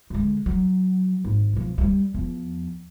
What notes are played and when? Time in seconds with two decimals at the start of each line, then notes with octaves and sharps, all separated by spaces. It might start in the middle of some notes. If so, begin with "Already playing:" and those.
0.10 D3 G#3
0.46 F#3
1.25 G#1
1.53 B2 F3
1.78 F#3 G3
2.14 E2 F3